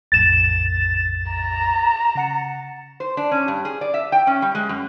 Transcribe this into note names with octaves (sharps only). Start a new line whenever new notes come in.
A#1 F2 A2 A6 E7
A#5
C#3 F#5 C#7
C5
D4
C#4
G2
G#4
D5
E5
G5
C#4
G3
G#3
F#2